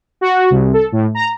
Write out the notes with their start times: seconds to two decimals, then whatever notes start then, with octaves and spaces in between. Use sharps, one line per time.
0.21 F#4
0.50 C2
0.73 A4
0.92 A2
1.15 A#5